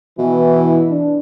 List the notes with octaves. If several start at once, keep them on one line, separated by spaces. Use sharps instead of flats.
B2 E3
D4